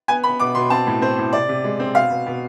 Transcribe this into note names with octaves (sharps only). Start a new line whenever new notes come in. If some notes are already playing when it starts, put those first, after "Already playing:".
B3 G#5
B3 B5
B2 D6
B2 C6
C4 A5
A2
C4 C5
A2
C3 D5
C3
G#3
C4
B2 F5
B2
B2